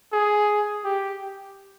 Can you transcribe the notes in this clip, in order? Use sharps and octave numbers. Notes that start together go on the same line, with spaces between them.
G#4
G4